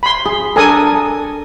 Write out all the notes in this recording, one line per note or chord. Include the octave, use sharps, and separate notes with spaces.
B5 C6
G#4
D4 A4 A#4 G#5 D#6